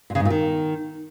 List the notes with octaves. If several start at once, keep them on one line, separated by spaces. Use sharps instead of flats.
A#2
C#3
G#2
A#2
D#3